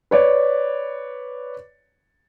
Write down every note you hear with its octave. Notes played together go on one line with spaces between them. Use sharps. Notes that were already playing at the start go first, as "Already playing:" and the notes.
B4 C#5 D5